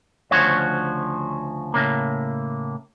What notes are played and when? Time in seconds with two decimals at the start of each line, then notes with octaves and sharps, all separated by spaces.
0.31 D2 C#3 F3 F#4 C#5
1.74 A2 C#3 A#3